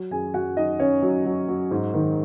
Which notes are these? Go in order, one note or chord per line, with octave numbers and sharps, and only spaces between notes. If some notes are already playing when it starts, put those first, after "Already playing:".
Already playing: F#3
F#2 G#4 G#5
F#2 F#4 F#5
F#3 D#4 D#5
F#2 C#4 C#5
F#3
F#3
F#3
G#2
D#3